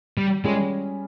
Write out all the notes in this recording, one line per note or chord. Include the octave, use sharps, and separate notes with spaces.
G3
G3 G#3 C#4 F4 G#4